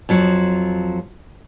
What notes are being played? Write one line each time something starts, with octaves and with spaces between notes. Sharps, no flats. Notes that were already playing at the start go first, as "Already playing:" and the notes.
F2 F3 F#3